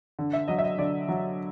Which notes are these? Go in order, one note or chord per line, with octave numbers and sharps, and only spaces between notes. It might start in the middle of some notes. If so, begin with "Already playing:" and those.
D3
E5
F#3 D#5
E5
D#5
D3 D5
F#3